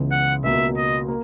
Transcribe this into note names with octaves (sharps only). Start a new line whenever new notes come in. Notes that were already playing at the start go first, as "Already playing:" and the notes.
Already playing: C#2 C#3 E3 B3
F#5
C#2 B2 A#3 E5
D#5
A#3